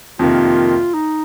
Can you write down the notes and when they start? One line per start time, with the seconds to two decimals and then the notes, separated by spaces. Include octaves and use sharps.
0.19 F2 C3 D#3 A#3 F4
0.94 D#4